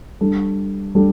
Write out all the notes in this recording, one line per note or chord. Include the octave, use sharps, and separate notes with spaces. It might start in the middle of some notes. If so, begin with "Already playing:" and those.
G3 D4 A4
G3 D4 A4